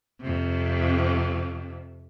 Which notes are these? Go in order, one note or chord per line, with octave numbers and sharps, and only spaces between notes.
F2 C3